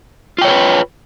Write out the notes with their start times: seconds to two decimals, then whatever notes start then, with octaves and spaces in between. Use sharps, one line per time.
0.38 F4
0.42 G5
0.45 C#5
0.48 A#4
0.51 B4